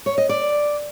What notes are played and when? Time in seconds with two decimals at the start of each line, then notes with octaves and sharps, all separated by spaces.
0.06 C#5
0.18 D#5
0.29 D5